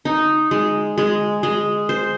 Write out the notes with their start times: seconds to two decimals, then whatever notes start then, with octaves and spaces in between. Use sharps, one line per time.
0.05 D#4
0.51 G#3
0.98 G#3
1.43 G#3
1.89 C5